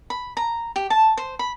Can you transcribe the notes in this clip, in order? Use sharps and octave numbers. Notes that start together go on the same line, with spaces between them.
B5
A#5
G4
A5
C5
B5